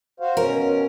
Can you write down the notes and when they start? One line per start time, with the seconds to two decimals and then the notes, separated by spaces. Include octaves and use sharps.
0.20 F#4 C5 F5
0.37 B2 C#4 A#4